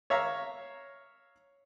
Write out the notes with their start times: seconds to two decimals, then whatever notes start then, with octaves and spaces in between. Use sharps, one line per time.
0.10 C#5 E5 F5 A#5